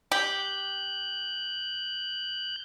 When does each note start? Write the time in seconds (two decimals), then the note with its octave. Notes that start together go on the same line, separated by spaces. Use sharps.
0.12 G4 F#6 G6